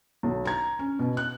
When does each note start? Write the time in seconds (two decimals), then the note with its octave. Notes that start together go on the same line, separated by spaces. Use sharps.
0.23 B1
0.45 A#5 G#6
0.79 C#4
0.99 B2
1.17 F#6